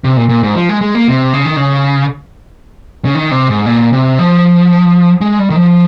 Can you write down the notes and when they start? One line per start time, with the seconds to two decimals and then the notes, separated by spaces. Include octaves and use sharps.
0.04 C3
0.17 A#2
0.29 A#2
0.43 G#2
0.55 F3
0.69 G#3
0.81 G#3
0.95 A#3
1.08 C3
1.34 C#3
1.45 D#3
1.56 C#3
3.05 C#3
3.15 D#3
3.31 C3
3.49 G#2
3.66 A#2
3.93 C3
4.19 F3
5.21 G#3
5.39 G3
5.50 D#3
5.56 F3